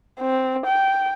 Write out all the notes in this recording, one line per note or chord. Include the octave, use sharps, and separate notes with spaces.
C4
G5